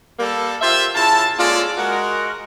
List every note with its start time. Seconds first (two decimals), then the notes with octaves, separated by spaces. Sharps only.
0.19 G3 A#3 A4
0.62 F4 G4 C5 E5
0.95 C#3 E4 F4 A5
1.38 G#3 A#3 C#4 F4 A4 D5
1.77 G#3 F#4 A#4